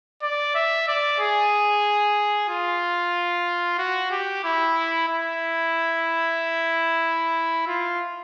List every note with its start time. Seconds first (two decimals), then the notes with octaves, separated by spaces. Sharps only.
0.22 D5
0.55 E5
0.88 D5
1.20 G#4
2.49 F4
3.78 F#4
4.11 G4
4.44 E4
5.08 E4
7.67 F4